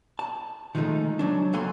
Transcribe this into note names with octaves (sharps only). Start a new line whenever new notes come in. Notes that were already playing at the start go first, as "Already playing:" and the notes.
A5
D#3 F3 G#3 A3 D#4
C#3 F#3 D4
C#2 F#3 A#3 A4 G#5 C6